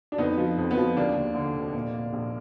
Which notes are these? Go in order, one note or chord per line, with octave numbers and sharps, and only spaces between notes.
D4
F2 B3 D#4
F3
F2
B3
F3
D#2 A#3 D4
D#2
D3
F1
A#2
A#2
A#1